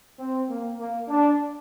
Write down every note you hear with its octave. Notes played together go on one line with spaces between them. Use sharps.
C4
A#3
A#3
D4